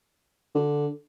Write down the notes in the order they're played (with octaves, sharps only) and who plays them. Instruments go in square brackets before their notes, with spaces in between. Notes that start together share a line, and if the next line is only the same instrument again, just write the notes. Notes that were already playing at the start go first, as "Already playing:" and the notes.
[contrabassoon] D3